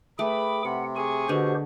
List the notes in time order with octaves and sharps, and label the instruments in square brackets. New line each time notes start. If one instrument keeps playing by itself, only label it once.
[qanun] A3 [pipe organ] G#4 G5 D6 [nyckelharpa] B4 B5
[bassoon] C3 [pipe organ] F#5
[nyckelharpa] G#4 C#6 [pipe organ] G#5
[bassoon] B2 [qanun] D3 [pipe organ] F#4 G4 C5